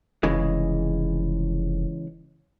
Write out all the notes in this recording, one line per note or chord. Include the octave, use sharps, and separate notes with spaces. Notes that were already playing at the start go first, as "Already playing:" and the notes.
F1 C#3 E3 G#3